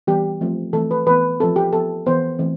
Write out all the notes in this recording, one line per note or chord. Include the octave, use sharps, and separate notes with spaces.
E3 G3 B3 G4
F3 A3 C4
E3 A3 C4 A4
B4
E3 B3 B4
F3 A3 C4 A4
G4
F3 B3 A4
E3 B3 C5
E3 A3 C4